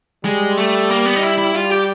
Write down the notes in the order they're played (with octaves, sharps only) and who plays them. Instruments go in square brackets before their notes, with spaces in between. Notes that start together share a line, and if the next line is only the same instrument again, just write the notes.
[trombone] G3 [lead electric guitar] G#3
[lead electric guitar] A3
A#3
B3
D#4
E4
E4
[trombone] G3 [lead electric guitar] F4
[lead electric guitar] G4